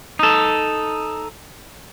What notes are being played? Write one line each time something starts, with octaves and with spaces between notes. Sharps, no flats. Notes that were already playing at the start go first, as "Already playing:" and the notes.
D#4 A4